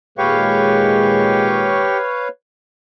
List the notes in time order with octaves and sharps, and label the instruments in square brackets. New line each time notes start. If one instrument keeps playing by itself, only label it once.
[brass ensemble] A#2 D#3 G#3 [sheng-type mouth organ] G4 C#6 [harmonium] B4 C#5 F5